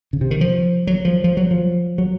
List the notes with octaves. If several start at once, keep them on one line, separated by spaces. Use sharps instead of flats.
C#3
C3
D#3
F3
F#3
F3
F3
F#3
F3
F#3